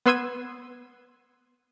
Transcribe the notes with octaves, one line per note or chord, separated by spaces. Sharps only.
B3 B4 C6 E6 G#6 D#7